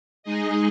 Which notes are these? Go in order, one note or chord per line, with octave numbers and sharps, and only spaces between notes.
G#3 D#4 G#4 D#5